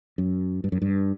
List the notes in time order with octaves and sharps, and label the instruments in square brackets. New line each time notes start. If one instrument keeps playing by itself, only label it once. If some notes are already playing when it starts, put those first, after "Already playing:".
[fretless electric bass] F#2
G2
F#2
G2